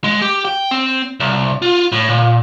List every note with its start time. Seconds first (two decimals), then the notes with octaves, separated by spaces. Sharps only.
0.04 G#3
0.22 G4
0.45 G5
0.71 C4
1.20 C2
1.62 F4
1.92 A2
2.09 A#2